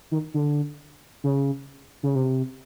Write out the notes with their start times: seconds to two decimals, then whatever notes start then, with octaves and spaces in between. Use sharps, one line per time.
0.11 D#3
0.34 D3
1.24 C#3
2.03 C#3
2.15 C3